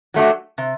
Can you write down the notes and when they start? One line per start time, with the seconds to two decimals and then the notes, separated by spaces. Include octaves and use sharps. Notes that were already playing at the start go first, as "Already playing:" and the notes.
0.14 F#3 A3 D4 F#4
0.58 C3